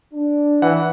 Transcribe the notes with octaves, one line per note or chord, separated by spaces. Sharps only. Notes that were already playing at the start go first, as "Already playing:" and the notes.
D4
E3 F#5